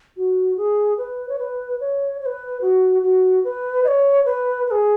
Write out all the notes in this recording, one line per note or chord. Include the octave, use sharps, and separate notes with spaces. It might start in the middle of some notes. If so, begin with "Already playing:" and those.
F#4
G#4
B4
C#5
B4
C#5
C#5
B4
F#4
F#4
B4
D#5
C#5
B4
B4
G#4